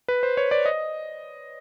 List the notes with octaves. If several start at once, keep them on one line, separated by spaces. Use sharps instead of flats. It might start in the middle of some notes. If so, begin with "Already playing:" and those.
B4
C5
C#5
D5
D#5